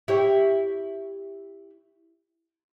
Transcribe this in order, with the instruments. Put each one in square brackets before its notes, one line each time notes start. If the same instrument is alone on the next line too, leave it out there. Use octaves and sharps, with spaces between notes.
[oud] E4 G4 C#5